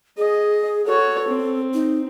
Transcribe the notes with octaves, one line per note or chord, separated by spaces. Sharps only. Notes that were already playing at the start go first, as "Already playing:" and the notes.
G#4 D#5
F#4 A4 C#5
C4
D#4